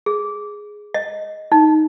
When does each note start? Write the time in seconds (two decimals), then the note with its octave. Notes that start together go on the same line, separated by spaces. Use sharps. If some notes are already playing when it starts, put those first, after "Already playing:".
0.06 G#4
0.94 D#5
1.52 D#4